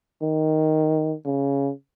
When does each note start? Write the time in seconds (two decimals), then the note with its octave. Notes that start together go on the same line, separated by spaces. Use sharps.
0.22 D#3
1.25 C#3